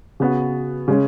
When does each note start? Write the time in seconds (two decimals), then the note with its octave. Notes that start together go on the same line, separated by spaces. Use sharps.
0.20 C#3 B3 F#4
0.88 C#3 G#3 C#4